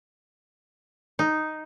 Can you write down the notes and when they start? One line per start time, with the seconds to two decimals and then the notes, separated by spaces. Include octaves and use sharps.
1.19 D#4